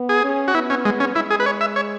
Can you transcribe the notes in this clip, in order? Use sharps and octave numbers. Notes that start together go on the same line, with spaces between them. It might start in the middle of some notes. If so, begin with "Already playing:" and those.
Already playing: B3
G#4
C#4
F#4
B3 E4
C#4
G#3
C#4
G#3 E4
G#4
B4
C#5
E5
C#5